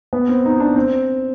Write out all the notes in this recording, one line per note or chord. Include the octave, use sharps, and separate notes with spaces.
B3
C4
D#4
D4
C4